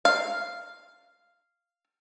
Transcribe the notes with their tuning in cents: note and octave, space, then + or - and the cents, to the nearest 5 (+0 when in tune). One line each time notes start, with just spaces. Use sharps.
F5 -5